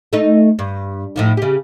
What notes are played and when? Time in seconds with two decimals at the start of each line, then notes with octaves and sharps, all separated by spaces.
0.13 A3 D#4
0.59 G2
1.16 A2 F3 D#4
1.37 C#3 G4